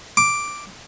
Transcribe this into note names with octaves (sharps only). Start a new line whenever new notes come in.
D6